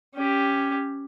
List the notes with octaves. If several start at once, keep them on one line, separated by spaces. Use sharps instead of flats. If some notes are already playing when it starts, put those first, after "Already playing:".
C#4 G4